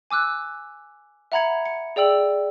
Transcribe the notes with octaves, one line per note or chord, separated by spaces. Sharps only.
G#5 D6 E6 F#6
E5 F#5 A#5 B5 G#6 C#7
C#7
G#4 D5 G5 E6 F#7